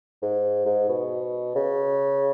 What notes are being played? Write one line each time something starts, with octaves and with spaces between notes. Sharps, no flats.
G#2
G#2
B2
C#3